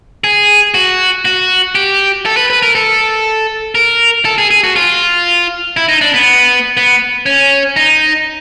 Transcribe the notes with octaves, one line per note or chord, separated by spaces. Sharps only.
G#4
F#4
F#4
G4
A4
B4
B4
A#4
A4
A#4
A4
G#4
G#4
F#4
F4
E4
D#4
D4
B3
B3
C#4
D#4